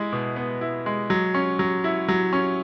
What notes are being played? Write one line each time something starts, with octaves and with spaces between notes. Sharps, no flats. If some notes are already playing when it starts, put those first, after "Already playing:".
Already playing: G#3 E4
B2
B3
E4
G#3
F#3
C#4
F#3
E4
F#3
C#4